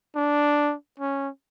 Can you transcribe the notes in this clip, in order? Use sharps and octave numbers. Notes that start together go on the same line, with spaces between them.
D4
C#4